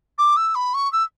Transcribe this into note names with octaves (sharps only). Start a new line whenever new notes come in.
D6
E6
B5
C#6
E6